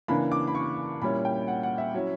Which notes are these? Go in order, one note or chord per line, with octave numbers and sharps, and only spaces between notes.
C#3 E3 A#3 D4 B5
D6
B5
C#6
A#2 G3 C#4 E4 B5
G5
F#5
F#5
E5
F#3 C#4 E4